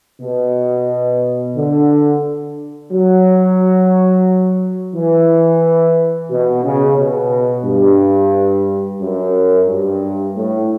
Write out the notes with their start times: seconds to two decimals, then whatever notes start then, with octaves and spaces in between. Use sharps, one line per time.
0.21 B2
1.56 D3
2.92 F#3
4.94 E3
6.30 B2
6.64 C#3
6.97 B2
7.65 G2
9.01 F#2
9.68 G2
10.36 A2